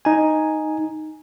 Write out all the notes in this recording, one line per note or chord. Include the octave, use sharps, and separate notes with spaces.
D#4 G#5